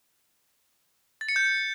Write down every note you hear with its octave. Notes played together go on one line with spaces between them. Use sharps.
A6
C#7
G6